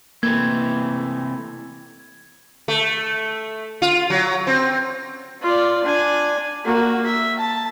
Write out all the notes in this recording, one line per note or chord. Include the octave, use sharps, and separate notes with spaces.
C3 E3 A3 A#3 G#6
A3
F4
F#3
C4
F4 D5
D4 G#5
A#3 F#4
E5
A5